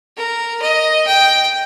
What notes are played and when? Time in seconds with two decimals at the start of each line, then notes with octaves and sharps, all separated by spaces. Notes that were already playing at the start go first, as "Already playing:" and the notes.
0.16 A#4
0.61 D#5
1.06 G5